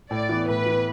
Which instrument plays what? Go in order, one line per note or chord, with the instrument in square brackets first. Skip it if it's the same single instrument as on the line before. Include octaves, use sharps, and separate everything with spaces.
[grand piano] A2 [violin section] D5
[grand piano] E3 B3
[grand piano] A2 [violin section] B4
[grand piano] E3 B3